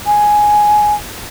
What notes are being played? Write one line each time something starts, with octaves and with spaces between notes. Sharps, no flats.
G#5